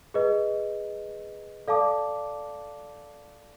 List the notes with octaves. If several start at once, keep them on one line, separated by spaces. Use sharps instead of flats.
G#4 B4 D#5
A4 D5 F5 A5 D6